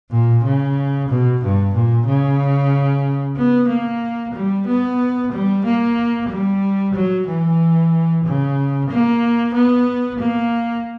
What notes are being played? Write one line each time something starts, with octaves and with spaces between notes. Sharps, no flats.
A#2
C#3
B2
G2
A#2
C#3
B3
A#3
G3
B3
G3
A#3
G3
F#3
E3
C#3
A#3
B3
A#3